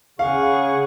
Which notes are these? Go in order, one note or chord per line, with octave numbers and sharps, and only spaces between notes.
C#3 G#4 F5 F#5 C#6